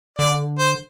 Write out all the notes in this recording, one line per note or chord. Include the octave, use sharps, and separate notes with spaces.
D3 D5
C5